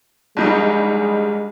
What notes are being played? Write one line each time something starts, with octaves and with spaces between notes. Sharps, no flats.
A#1 G3 G#3 D#4